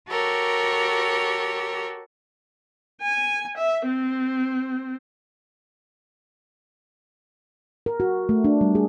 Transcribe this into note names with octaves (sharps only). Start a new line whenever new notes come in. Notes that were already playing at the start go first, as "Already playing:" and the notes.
F#4 G4 A4 A#4 C#5
G#5
E5
C4
A#4
F#4
A3
D4
G3
G#4